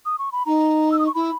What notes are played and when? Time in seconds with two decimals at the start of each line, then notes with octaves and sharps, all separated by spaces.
0.06 D#6
0.19 C#6
0.32 B5
0.46 D#4 A#5
0.92 E6
0.99 D#6
1.07 C#6
1.14 E4 B5